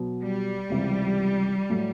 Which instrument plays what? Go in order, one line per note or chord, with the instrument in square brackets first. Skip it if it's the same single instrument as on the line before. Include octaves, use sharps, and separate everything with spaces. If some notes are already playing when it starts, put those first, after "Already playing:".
Already playing: [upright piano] B2 F#3 B3
[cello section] G3
[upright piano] C#2 C3 E3 G#3
A2 F#3 A3